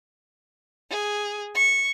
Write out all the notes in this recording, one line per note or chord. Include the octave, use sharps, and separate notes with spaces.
G#4
C#6